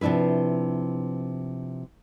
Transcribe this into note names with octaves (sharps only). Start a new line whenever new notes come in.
C3 F3 D4 E4 B4